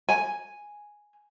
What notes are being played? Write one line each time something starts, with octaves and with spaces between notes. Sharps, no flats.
G#5